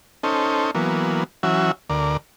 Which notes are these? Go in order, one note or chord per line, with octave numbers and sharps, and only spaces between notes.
C#4 D#4 A4 C5
E3 F#3 A#3 B3
E3 F#3 C#4 F#4 E5
D2 A#4 D5